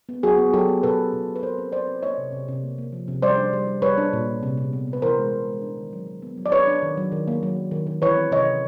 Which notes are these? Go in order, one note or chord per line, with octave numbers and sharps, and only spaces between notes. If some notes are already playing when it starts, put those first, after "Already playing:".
B3
F#3 F#4 G#4
B3
F#3 G4 A4
B3
B2 A4 B4
B2
B2
B2
B4
C4 A#4 C5
C4
C4 C5 D5
C4
A#3 C#5 D#5
C3
C3
C3
A#3
A#3
F3
C3
G3 C5 D5
D4
G3
G3
G3 B4 C#5
D4
A#2
D4
C3
C3
B3
B3
B4
E3 A#4 C5
G#3
C3
G#3
D4
D#3
F#3
F#3
B3
F#3
D5
D4 B4 C#5
D4
D#3
F#3
D#3
A#3
F#3
A#3
D#3
D#3
E3 B4 C#5
C4
C3 C#5 D#5
C3